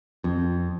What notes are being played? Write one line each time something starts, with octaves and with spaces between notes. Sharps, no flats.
F2